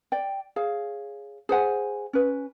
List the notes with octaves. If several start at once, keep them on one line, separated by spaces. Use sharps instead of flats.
D5 G5
G#4 C#5 F5
G#4 C5 F#5 G#5
C#4 B4